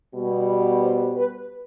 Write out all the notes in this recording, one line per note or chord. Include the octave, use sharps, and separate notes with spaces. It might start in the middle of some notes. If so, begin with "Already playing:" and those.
B2 G3 B3
C5
B4